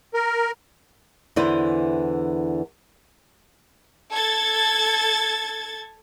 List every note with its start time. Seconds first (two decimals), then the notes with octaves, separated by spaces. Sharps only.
0.14 A#4
1.36 E2 D3 E3 E4 B4 C5
4.13 A4 G#6 A6